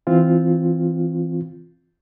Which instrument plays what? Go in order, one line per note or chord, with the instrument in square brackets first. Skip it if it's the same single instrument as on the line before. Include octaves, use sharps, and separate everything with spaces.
[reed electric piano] E3 C4 F4